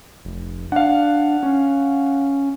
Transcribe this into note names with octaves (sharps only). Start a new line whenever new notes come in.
F1
D4 F5 F#5
C#4